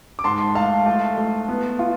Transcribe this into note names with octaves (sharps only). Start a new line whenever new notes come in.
D6
G#2 A5 C6
A3 F5 A5
A3
A3
B3
F4